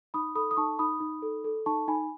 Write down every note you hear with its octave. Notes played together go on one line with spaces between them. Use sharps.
D#4 B5 D#6
A4 B5 D#6
D#6
D#4 A5 C#6
D#4 B5 D#6
D#4
A4
A4
D#4 A5 C#6
D#4 G#5 B5